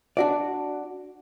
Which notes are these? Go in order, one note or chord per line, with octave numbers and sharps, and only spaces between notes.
D4 F#4 D5